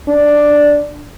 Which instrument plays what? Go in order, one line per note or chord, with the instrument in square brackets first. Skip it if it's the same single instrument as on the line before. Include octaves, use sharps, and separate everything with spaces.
[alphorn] D4